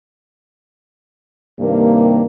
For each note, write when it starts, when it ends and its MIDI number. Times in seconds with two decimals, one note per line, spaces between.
1.60 2.23 43
1.60 2.23 48
1.60 2.23 51
1.60 2.23 58